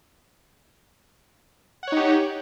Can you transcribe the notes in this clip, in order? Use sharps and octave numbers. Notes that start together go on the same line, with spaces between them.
D#4 G4 C#5 F#5